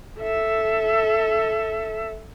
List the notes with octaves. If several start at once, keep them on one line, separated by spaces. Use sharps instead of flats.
A4 E5